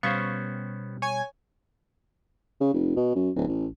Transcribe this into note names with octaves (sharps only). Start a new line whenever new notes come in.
B2 G3 B3 C#4 G4 C5 F5 C#6
C#5 G#5
C#3
F1
B2
F#2
D1
A1